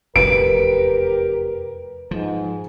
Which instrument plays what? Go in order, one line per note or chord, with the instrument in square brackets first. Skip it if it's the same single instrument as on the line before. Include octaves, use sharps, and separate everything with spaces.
[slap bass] F1 E2 [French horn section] G4 A#4 [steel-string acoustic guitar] B4 [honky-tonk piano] D7
[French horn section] G#2 [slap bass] F3